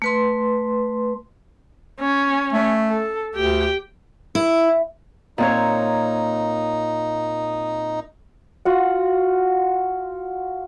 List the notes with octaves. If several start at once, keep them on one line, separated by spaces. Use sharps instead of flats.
A3 B4 C6
C#4
A3
A4
D2 G4 G5
E4
A#2 C4 D#4 C#5
F4 F#4 F#5